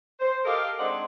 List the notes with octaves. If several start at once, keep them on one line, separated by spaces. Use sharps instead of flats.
C5
G4 A4 A#4 D#5 F5
G#3 C4 D4 D#4 C5 F#5